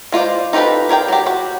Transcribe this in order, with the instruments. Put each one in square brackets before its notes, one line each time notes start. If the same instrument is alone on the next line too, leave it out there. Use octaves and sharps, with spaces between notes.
[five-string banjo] G#3 F4 C5 D5
D#4 F4 G4 A4 B4
G#4 A#4 D5 G5
F#3 G4
F#4 G4